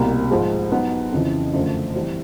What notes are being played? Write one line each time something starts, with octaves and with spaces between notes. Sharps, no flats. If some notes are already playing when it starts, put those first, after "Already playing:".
Already playing: C2 B2 G3 A#3
G#2 F3 G#3
F#3 B3 D#4
F2 C#3 E3
F#2 D3 F3 A3
E3 G3 C4